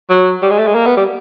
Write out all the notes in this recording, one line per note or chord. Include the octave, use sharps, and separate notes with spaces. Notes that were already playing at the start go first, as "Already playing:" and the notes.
F#3
G3
G#3
A3
G#3
A#3
B3
G3